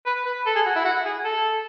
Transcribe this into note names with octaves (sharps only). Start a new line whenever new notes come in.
B4
B4
A4
G#4
F#4
E4
F#4
G#4
A4